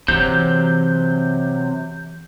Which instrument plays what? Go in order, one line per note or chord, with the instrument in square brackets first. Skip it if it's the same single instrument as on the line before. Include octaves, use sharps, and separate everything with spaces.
[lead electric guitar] C3 F#3 [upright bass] E3 [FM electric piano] G6